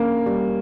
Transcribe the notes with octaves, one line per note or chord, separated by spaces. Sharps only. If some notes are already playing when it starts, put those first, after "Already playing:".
Already playing: A#3 C#4
G3